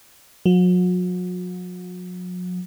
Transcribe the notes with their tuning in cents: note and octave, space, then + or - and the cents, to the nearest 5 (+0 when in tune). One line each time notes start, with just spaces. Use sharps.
F#3 -40